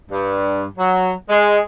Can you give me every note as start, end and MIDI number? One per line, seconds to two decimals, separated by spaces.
0.10 0.64 43
0.78 1.12 54
1.30 1.60 56